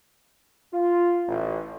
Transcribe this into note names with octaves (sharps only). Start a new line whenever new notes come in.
F4
A1